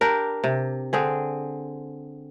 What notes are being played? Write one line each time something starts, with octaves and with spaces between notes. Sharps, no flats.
D4 G4 A#4
C3
D3 C4 G#4